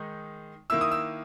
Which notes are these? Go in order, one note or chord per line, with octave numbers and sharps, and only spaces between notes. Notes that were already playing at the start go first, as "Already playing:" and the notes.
Already playing: D#3 G#3 D#4
D#3 A#3 E4 E6
D#6
E6